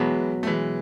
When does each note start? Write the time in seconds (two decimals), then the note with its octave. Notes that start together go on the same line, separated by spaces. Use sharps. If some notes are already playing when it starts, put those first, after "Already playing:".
Already playing: B2 E3 F#3 G#3 B3
0.43 A3
0.47 E3 G#3